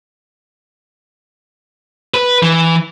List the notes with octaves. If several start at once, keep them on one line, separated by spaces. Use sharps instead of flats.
B4
E3